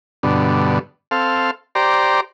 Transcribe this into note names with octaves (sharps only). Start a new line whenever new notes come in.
G2 B2 D3
C4 A4 F5
G4 C5 D5 A#5